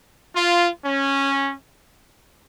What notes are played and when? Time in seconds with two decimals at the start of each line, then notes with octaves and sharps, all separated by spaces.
0.35 F4
0.84 C#4